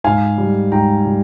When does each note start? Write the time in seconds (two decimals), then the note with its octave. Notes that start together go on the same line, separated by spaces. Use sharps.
0.04 G#2 F5 G#5
0.38 G3
0.72 G#2 G5 A#5
1.05 G3